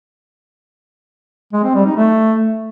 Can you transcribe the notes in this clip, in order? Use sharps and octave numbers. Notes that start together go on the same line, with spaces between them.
G#3
C4
G3
D#4
A3